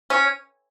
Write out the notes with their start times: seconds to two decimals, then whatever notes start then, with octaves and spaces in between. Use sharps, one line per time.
0.10 C#4